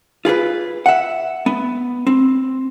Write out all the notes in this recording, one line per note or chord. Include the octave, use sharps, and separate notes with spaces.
F4 G#4 A#4 B4
E5 F#5
B3
C4